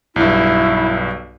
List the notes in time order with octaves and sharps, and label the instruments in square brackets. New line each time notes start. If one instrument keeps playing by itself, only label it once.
[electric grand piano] B1 G2 [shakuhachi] E4